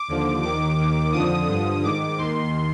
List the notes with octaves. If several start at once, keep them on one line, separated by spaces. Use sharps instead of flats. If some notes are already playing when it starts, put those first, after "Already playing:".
Already playing: D6
D#2 D3 F3
D#2 D#3 D6
D#2 D#3
F2 D3 F3 D#6
G2 D3 F3 D#6
G#2 D#3 D6
D#2 D#3 C6